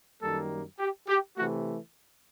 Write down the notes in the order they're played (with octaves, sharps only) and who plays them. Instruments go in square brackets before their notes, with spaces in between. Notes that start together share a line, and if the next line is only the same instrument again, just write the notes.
[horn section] F#2 D#3 G3 A#3 A4
G4
G4
C3 E3 A3 F#4